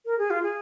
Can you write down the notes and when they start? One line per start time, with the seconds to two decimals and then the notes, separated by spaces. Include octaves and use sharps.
0.06 A#4
0.18 G#4
0.30 F4
0.43 G#4